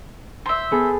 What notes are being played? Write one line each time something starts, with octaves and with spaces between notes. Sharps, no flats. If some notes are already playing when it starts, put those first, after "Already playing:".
C5 E5
B3 G#4 A4